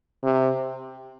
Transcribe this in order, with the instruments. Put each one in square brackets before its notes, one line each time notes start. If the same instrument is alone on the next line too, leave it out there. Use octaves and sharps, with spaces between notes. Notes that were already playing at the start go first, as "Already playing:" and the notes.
[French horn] C3